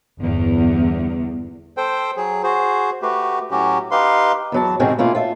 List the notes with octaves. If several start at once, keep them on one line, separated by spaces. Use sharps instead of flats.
G1 E2
A4 C5 G5
F#3 G#4
F#4 G#4 C5
A3 F#4 G4 B4
A2 F#3 C#4 F#4 G4
D#4 G4 B4 F5 C6
E2 F#3 A5
G#2 C3 D#3 G#3 C4 C#4
B2 A3 A#3 C#4 F4
F4 A4 E5